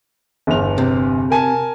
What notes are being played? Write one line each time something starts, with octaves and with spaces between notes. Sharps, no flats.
G1 E2 F7
C3
A#4 G#5 A5